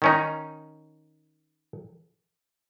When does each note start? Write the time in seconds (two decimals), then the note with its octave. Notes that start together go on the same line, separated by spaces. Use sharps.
0.02 D#3 C#4 D#4